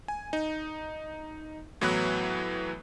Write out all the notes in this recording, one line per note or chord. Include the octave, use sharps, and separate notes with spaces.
G#5
D#4
A2 E3 F#3 B3 B4 F#6